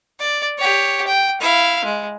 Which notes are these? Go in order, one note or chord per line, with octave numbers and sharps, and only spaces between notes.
D5
G4 C#5
G5
E4 F5
G#3